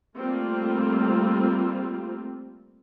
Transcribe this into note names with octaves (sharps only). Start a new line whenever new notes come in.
G3 A3 A#3 C4 F4